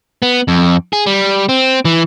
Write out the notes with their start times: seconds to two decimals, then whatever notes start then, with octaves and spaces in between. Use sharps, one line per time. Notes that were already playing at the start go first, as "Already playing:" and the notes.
0.22 B3
0.48 F2
0.93 G#4
1.06 G3
1.49 C4
1.85 E3